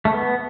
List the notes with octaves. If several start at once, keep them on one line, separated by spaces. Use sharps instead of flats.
A3
B3